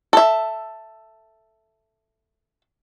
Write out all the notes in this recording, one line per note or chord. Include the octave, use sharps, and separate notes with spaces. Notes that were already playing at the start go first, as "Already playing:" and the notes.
A4 E5